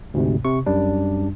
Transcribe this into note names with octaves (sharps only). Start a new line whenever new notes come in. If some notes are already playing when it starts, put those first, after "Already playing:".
D2 G#2 C3
C3 C#6
F#2 G3 D4